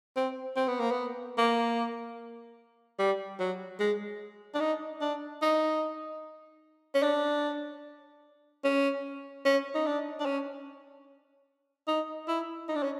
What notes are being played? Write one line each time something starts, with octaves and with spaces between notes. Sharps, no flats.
C4
C4
B3
A#3
B3
A#3
G3
F#3
G#3
D4
D#4
D4
D#4
C#4
D4
C#4
C#4
D#4
D4
D4
C#4
D#4
E4
D#4
D4
C#4